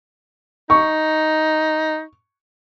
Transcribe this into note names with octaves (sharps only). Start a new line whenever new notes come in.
D#4 C#6